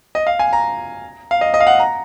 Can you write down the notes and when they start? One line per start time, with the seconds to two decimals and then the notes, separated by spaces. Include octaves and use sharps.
0.15 D#5
0.27 F5
0.39 G#5
0.53 A#5
1.31 F5
1.41 D#5
1.54 D#5
1.60 F5
1.67 F#5
1.80 A#5